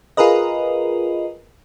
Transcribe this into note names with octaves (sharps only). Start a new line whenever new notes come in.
F4 G#4 A#4 B4 D#5